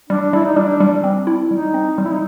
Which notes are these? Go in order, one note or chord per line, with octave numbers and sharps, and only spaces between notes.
G3 D4
G3 E4
D#4
G3 D4
G3
C4
E4
G3 D#4
C4
G3
E4
D#4